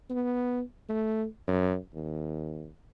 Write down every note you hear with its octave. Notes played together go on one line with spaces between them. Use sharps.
B3
A3
F#2
D#2